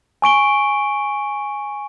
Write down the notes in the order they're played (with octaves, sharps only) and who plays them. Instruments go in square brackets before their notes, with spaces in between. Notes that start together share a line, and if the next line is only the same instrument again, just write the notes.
[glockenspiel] G#5 C#6 D7 G7